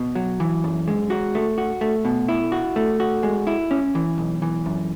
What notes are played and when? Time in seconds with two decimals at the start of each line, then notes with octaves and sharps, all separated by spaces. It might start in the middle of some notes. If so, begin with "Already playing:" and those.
Already playing: B2
0.15 F#3
0.40 E3
0.64 F#2
0.88 G#3
1.10 F#4
1.35 A3
1.58 F#4
1.81 A3
2.05 B2
2.28 E4
2.52 F#4
2.76 A3
3.00 F#4
3.23 G#3
3.47 E4
3.71 C#4
3.95 E3
4.18 B1
4.42 E3
4.66 F#2